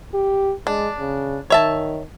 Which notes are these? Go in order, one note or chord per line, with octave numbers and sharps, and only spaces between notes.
G4
G#3 D4
C#3
D#3 C#5 E5 A5